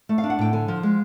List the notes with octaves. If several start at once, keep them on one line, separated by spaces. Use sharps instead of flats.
A3
F5
D4
F#5
A2 G5
D3 G#5
F3
G#3